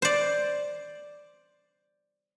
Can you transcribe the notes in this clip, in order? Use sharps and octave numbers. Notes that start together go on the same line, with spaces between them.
C5 D5